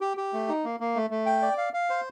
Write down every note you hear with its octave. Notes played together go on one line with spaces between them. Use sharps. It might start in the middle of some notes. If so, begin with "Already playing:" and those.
G4
G4
A3
D#4
A#3
A#3
A3
A3
G5
D5
F5
F5
C5